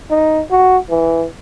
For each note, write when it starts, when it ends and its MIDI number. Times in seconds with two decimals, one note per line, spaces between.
0.10 0.42 63
0.51 0.77 66
0.90 1.26 52